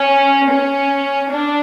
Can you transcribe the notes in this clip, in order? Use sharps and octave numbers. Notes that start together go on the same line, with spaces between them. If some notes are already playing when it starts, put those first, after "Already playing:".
Already playing: C#4
C#4
D4